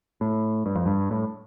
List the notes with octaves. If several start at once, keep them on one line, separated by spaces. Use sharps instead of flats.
A2
G2
F2
G2
A2